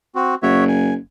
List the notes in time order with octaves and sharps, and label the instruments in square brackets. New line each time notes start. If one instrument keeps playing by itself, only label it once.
[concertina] C4 F#4
[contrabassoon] F#1 [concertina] F#4 C#5 E5
[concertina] G#5